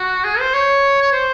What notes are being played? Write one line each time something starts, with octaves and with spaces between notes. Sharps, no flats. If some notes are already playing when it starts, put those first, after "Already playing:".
Already playing: F#4
G#4
C5
C#5
C#5
C5